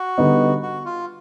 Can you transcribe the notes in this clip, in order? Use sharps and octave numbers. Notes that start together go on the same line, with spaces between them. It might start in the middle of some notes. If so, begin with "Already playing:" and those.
Already playing: F#4
D3 G3 B3 D#4
F#4
F4